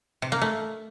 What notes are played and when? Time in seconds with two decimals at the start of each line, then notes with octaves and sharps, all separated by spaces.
0.22 C3
0.32 A#3
0.41 A3